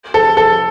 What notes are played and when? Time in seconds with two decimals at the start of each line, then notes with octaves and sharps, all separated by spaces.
0.14 A4
0.37 A4